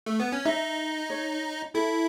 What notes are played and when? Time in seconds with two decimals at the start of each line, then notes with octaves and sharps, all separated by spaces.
0.06 A3
0.20 B3
0.32 C#4
0.46 D#4 E5
1.10 C#5
1.74 E4 A4